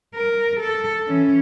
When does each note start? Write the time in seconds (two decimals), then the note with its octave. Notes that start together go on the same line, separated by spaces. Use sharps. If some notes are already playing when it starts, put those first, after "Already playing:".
0.15 A#4
0.60 A4
1.08 E3 C#4